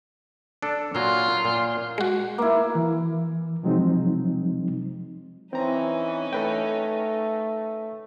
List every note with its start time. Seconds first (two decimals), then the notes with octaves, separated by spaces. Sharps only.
0.63 D4 A4
0.95 A#2 F#3 F4
1.45 A#2
1.98 G#3 F#4
2.38 A#3 E4
2.75 E3
3.63 C3 F3 F#3 G#3 C4 D#4
5.53 E3 C4 C#4 D#4 A#5
6.33 A3 A4 B4 G5